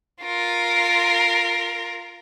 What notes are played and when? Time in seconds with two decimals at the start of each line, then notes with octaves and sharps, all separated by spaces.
0.22 F4 A#4